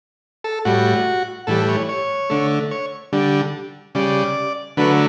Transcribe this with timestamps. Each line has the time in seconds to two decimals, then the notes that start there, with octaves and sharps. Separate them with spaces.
0.44 A4
0.65 A2 G3 F#4
1.47 A2 E3 G3 A4
1.69 C#5
1.89 C#5
2.30 D3 A3
2.71 C#5
3.13 D3 G3
3.95 C#3 G3 D5
4.77 D3 F#3 A3 B4